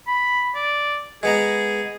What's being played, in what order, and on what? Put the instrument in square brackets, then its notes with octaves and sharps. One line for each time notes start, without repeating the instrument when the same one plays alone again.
[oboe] B5
D5
[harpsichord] G#3 B3 A#5 [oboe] G#4